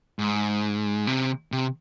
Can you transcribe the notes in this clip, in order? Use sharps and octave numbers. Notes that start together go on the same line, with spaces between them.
G#2
C3
C3